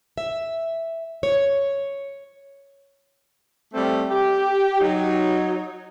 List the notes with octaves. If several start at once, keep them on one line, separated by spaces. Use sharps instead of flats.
E5
C#5
G3 A3 C4
G4
F#3 D#4